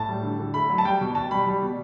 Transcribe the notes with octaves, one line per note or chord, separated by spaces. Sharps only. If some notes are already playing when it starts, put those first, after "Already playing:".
Already playing: A2 A5
G3
D3
D3
A3 B5
F#3
A5
G3 G5
B2
B2 A5
G3 B5
G3
B2